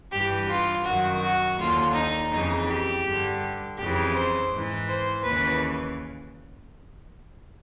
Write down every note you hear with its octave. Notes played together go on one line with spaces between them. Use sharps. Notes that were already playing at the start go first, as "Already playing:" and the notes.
G2 E3 G4
F4
F#2 D#3 F#4
F#4
D#2 D3 F4
D#4
F2 C#3 E3 D#4
G4
G2 D3
F2 C#3 E3 G4
C5
G#2 E3
C5
D#2 C#3 E3 B4